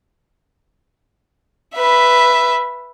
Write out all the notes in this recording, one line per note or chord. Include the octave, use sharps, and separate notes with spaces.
B4 E5